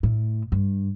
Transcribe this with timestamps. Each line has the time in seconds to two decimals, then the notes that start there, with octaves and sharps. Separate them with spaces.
0.03 A2
0.52 G2